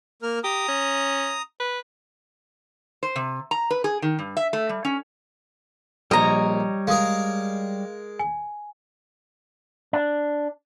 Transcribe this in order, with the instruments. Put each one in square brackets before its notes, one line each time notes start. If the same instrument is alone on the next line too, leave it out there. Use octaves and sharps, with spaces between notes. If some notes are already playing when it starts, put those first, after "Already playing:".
[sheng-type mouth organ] A#3 A#4 F6
[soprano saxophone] G4 [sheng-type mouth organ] A#5 D#6
[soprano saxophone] C#4
B4
[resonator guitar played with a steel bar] C5
C3
A#5
B4
G#4
D#3
G2
E5
A3
G3
C#4
[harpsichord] A#1 [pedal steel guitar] G3 C#5 [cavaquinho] D#5 A#5
[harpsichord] G#3 A#4 [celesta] F5 D#6
[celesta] G#5
[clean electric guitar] D4